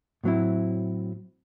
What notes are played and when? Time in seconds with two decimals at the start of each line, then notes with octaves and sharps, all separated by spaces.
0.24 A2 F#3 C4 E4